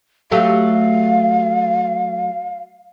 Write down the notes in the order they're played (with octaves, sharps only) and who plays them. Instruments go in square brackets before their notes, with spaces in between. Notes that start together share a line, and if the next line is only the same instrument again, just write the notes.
[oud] F#3 A3 G4 [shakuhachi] F5